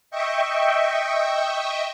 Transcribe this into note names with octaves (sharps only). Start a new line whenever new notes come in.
D#5 E5 G5 C#6